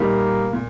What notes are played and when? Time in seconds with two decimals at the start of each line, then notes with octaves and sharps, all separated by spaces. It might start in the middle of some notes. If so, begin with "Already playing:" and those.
Already playing: A#2 G3 A#3 D#4
0.53 A#2